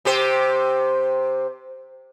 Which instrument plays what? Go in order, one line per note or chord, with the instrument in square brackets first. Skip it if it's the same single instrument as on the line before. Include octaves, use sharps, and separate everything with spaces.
[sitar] C3 G4 C5